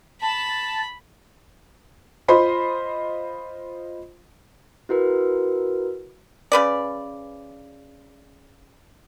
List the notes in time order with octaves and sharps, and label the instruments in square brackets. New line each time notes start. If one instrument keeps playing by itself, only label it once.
[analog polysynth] A5 [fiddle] B5
[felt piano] F4 C5 D#5 B5 C6
[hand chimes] E4 F#4 A#4 B4
[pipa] C#3 B4 D5